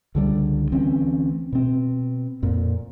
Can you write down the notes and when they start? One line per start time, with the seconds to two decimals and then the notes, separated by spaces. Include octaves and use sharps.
0.15 C#2 D3 G3
0.72 D2 E3 C4 C#4
1.53 B2 C4
2.43 F2 A#2